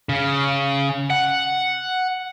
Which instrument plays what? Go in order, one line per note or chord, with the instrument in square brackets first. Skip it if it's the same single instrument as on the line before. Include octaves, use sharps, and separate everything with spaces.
[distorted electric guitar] C#3
F#5